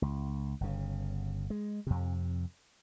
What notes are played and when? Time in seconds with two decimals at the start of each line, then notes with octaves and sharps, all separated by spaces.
0.02 C#2
0.61 G1 C#3
1.50 G#3
1.87 F2 C3